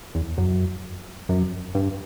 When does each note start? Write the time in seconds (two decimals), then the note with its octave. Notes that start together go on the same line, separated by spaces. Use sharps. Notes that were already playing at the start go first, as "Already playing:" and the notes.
0.15 E2
0.38 F#2
1.29 F#2
1.75 G2